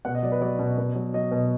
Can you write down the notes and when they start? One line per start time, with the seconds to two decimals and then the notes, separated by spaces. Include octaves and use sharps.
0.05 B2 F#5
0.15 D#5
0.23 F#3 D5
0.32 B4
0.41 F#3 D5
0.59 B2
0.78 B2
0.95 F#3
1.14 F#3 D#5
1.32 B2